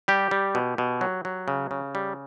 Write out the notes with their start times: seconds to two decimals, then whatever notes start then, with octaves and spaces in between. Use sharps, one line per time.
0.08 G3 G4
0.31 G3
0.55 B2
0.78 B2
1.01 F#3
1.25 F#3
1.48 C#3
1.71 C#3
1.95 G3